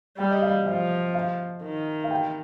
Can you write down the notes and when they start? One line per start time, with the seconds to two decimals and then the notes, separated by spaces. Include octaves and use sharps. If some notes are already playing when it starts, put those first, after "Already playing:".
0.18 G3 G5
0.31 D#5
0.42 F5
0.66 F3 F5
1.15 F5
1.63 D#3
2.04 F5
2.11 G5